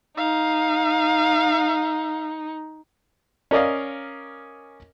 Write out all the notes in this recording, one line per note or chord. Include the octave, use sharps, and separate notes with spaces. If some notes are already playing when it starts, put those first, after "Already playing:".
D#4 F5
C#4 A#4 D5 D#5 F5